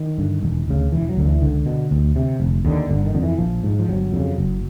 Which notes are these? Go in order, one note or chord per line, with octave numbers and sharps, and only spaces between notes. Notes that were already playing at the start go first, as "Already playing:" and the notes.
Already playing: D#3
G2 D3
E1
D2 C#3
E1 E3
F#3
D2 D3
E3
C#2 D3
B2
D2
C3
F1
D#2 D3
G1 D3
D#3
F2 D3
E3
A#1 F3
G#2
F3
G1 F#3
F2 C#3
F#1